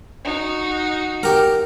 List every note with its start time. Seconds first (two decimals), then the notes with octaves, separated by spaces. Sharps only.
0.25 D#4 F#4
1.23 G4 A#4